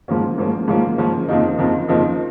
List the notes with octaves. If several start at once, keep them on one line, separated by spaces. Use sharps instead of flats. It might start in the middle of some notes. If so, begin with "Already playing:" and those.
G#2 F3 A#3 C#4
G#2 F3 A#3 C#4
G#2 F3 A#3 C#4
G#2 F3 A#3 C#4
F2 C#3 F3 A#3 D#4
F2 C#3 F3 A#3 D#4
F2 C#3 F3 A#3 D#4